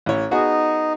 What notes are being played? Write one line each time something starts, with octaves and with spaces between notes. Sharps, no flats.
A1 E4 C#5
B3 D#4 F#4 G#4